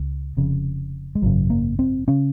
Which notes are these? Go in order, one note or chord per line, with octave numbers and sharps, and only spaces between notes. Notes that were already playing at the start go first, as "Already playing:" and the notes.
Already playing: C#2 C#3
F1 F2 C#3
G#3
G#1 F#2 C#3 F#3
A#3
C4
C#3 C#4